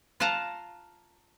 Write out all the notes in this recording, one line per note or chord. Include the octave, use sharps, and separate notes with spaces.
F4 F5 F#5 A5 A#5